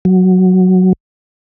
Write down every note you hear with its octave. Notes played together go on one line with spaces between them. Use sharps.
F#3